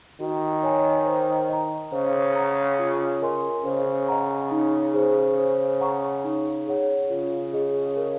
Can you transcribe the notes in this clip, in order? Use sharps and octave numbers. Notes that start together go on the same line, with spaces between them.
D#3 F#4
C#5 G#5
C5
D#5 A#5
C#3 C5
F#5 A#5
F4
A#4 D#5 G#5 C6
C#3 C5
D#5 F#5 A#5
D#4
G#4 C5
C5
F#5 A#5 C#6
D#4
G#4 C#5 F#5
C#3 F4
G#4 D#5
A#4